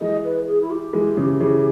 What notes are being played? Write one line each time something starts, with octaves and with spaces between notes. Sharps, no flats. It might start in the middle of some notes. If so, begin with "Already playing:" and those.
E3 G#3 D#5
B4
G#4
E4
G4
E3 G#3
C#3 E3
C#3 E3